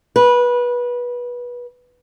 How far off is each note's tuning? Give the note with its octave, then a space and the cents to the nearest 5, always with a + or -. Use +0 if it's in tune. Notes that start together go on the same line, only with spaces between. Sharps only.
B4 -20